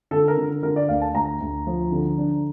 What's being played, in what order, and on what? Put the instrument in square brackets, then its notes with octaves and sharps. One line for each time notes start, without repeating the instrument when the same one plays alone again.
[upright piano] D3 A4
A#4
D3
D3 A#4
D5
D2 F5
A5
D2 A#5
D2
F3
D3
D4